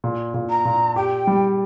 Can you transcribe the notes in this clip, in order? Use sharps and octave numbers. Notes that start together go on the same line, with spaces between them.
A#2
A#2
A#5
A#2
G4 G5
G3